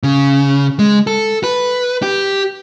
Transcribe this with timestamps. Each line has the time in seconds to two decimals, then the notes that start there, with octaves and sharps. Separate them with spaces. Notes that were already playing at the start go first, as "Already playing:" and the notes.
0.03 C#3
0.79 G#3
1.07 A4
1.44 B4
2.02 G4